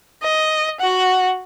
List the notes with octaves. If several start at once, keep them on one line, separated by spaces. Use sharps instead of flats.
D#5
F#4 F#5